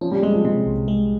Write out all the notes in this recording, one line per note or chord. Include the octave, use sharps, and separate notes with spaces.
F3 C#4
G3
G3 G#3
F3
C3 G#3
C2
G#3